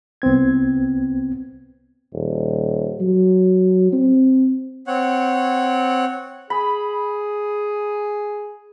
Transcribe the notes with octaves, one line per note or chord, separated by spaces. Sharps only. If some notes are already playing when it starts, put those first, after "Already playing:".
C2 B3 C4 G#6
D#1
F#3
C4
C4 C#5 F#5
G#4 B5